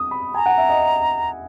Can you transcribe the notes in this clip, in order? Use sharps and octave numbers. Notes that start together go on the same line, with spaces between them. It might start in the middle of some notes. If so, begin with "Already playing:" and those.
Already playing: D#6
B5
G#5 A#5
F#5
E5
D#5